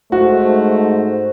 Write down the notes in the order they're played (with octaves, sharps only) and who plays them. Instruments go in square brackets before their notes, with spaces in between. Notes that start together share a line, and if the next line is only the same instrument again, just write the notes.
[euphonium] G#2 [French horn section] A3 [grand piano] F#4 [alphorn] C5